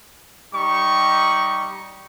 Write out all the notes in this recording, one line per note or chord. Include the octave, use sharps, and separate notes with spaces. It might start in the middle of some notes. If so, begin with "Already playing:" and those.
G3 D#4 C#6